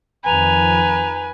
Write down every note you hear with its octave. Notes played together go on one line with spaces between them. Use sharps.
F2 D#3 F3 B4 G#5 A#5